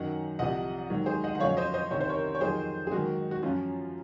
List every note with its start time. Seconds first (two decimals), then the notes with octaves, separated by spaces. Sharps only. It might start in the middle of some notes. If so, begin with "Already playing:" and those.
Already playing: F#2 D#3 F#3 F#5
0.39 C2 C3 F3 D#5 F#5
0.90 G#2 D#3 F#3
1.06 G#4 C5
1.24 D#5 F#5
1.35 F#5
1.40 F2 C#3 F#3 C#5 F5
1.57 C5 D#5
1.74 C5 D#5
1.91 C2 C3 D#3 C#5
2.01 C5
2.09 A#4 C#5
2.35 C#5
2.41 F2 D#3 F#3 G#4 C5
2.87 G#4
2.92 G#2 D#3 F#3 D#4 F#4
3.31 F#4
3.42 F#2 F3 C#4 F4